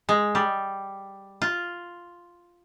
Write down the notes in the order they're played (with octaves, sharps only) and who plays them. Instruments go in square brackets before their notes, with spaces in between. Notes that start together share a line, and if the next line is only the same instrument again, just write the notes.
[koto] G#3
G3
F4